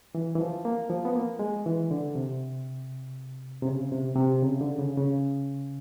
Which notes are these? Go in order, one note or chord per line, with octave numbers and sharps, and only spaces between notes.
E3
E3
F3
A#3
F3
B3
A#3
G#3
E3
D3
C3
C3
C#3
C3
C3
C#3
D3
C#3
C#3